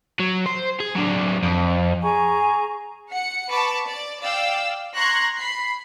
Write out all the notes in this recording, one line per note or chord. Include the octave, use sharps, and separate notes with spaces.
F#3
C5
G#4
F#3 D4
F2
G#4 G#5 A#5 C#6
F#5 C#7
B4 A5 B5 C#6 D6
D5
D5 F5 G5 D6 E6
A#5 C6 C#6 F#6 G#6 A#6
B5 C7